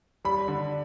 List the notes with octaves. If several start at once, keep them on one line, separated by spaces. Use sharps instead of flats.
G3 B5
D3